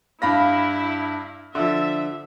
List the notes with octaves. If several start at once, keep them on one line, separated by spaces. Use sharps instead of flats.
G2 E4 F5 B5 A#6
D3 F3 E5